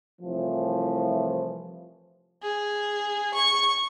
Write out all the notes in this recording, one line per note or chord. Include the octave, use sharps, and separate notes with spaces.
C2 A2 E3 F3
G#4
C#6